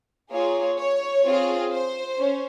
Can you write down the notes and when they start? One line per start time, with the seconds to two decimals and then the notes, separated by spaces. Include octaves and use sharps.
0.30 A#3 F4 G#4 C#5
0.78 C#5
1.24 C4 F4 G#4
1.71 C5
2.18 C#4